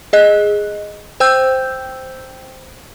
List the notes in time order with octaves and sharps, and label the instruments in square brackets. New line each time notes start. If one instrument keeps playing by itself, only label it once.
[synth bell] G#4 D#5 F#6
C5 G5 E6 G6